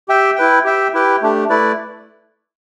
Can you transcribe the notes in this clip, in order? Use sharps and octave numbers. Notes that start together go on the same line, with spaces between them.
G4 E5 G5
E4 B4 G5
G4 E5 G5
E4 G4 B4 G5
A3 D4 G4
A3 E4 B4 D5